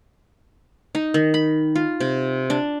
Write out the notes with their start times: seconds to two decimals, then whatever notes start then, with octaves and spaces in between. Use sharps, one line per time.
0.95 D#4
1.14 D#3
1.34 B5
1.76 F4
2.00 C3
2.50 D4